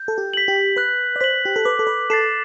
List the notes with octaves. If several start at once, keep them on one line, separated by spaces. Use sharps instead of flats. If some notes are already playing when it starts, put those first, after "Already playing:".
Already playing: G6
A4
G4
B6 F#7
G4
B4 F#6
D5
C5 B6 F#7
G4
A4
B4 D6
A4
B4
A4 A6 C7 E7